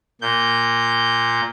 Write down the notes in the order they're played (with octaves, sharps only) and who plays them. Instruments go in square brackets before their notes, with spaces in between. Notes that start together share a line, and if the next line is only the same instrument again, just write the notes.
[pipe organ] A#2 G6